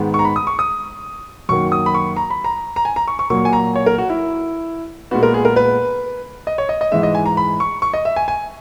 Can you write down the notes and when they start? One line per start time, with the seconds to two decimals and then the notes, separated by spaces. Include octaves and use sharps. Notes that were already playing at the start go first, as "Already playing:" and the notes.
Already playing: G#2 D#3 G#3 B3
0.14 C#6
0.19 A#5
0.25 B5
0.36 D#6
0.47 C#6
0.59 D#6
1.49 F#2 D#3 F#3 A#3 C#6
1.72 D#6
1.86 B5
1.94 C#6
2.17 A#5
2.30 B5
2.44 A#5
2.76 A#5
2.85 G#5
2.96 A#5
3.08 C#6
3.19 C#6
3.30 A#2 F#3 A#3 C#6
3.45 G#5
3.53 A#5
3.76 C#5
3.86 A#4
3.98 F#4
4.10 E4
5.11 A#2 G#3 B3 F#4
5.23 A#4
5.34 G#4
5.45 A#4
5.56 B4
6.47 D#5
6.58 C#5
6.69 D#5
6.81 D#5
6.92 G#2 E3 G#3 E5
7.03 D#5
7.15 G#5
7.26 A#5
7.37 B5
7.60 C#6
7.82 C#6
7.94 D#5
8.05 E5
8.16 G#5
8.28 G#5